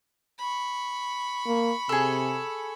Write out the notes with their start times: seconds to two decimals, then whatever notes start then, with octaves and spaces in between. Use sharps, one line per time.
0.38 B5 C#6
1.47 A#3
1.89 C3 G#4 A4